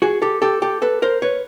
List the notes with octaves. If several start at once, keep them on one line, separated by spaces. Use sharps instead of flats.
F#4 G#4
G4 A4
G4 A4
G4 A4
A4 B4
A#4 C5
B4 C#5